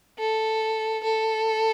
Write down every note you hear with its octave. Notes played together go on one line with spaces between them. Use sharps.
A4
A4